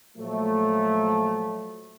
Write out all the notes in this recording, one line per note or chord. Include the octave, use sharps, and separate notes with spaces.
A#2 F3 F#3 A3